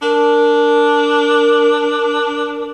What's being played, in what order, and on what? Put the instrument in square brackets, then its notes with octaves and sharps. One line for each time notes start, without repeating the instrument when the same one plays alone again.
[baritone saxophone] D4 [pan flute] A#4